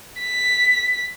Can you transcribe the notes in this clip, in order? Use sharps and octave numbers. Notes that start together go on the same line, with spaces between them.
B6